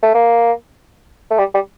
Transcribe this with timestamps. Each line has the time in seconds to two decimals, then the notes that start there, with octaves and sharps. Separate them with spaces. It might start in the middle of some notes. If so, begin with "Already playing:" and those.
0.03 A3
0.14 A#3
1.31 A3
1.39 G3
1.54 G3